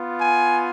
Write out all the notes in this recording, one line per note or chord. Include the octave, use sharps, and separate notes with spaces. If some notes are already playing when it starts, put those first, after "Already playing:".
Already playing: B3 F4
G#5